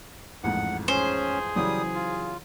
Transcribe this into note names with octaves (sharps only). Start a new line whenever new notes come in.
A1 F2 G#2 F#5
C#4 G#4 C5
C#3 E3 F#3 G3 D#6
F4